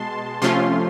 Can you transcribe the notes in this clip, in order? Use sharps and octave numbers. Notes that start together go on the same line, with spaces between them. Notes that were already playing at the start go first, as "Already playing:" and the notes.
Already playing: B2 G#3 A5 C6
C3 F3 A3 C#4 F4 C6